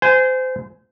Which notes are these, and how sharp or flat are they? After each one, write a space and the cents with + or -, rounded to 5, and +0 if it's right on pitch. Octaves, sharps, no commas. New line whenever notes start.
C5 -25 G#5 +0